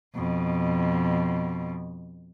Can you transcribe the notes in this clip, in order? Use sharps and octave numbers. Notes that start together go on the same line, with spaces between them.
F2 B2